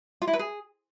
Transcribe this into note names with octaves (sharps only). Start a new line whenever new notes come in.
F4
E4
B4
G#4